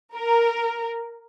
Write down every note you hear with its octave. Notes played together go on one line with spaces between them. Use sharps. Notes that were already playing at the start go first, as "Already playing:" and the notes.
A#4